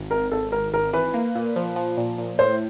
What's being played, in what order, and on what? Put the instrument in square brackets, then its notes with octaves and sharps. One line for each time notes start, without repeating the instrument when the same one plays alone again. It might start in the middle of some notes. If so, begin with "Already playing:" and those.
Already playing: [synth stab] G#1
[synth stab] G#1 [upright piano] A#4
[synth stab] G#1 [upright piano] A4
[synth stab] G#1 [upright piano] A#4
[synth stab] G#1 [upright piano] A#4
[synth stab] E3 [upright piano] B4
[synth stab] A#3
A#2
F3
F3
A#2
A#2
[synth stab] A2 [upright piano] C5